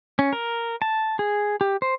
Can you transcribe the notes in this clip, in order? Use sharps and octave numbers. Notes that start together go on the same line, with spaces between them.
C#4
A#4
A5
G#4
G4
C5